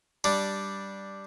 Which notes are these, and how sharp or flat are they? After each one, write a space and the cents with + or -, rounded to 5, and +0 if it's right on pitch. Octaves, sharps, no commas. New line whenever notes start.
G3 +0 D4 +0